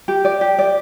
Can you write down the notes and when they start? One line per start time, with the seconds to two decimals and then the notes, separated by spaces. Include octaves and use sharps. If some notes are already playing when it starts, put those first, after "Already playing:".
0.08 G4
0.25 D5
0.41 G4
0.59 D5